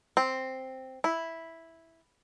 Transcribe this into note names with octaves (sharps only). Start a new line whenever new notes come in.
C4
E4